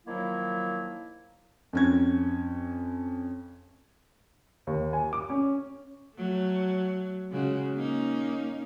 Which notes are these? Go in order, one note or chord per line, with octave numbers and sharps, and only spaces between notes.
D#3 F3 F#3 A#3 E4
F2 C#4 G#6
D#2
G#5
D6
C#4
F#3 A3
C#3 G#3 F#4
A#3 C#4 D#4